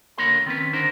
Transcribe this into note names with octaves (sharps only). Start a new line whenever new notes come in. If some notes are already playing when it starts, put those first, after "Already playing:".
D3 A#3 A#4 C#5 B5 C6
D#3 C4 C#4 B4
D3 D4 D#4 A#4 C5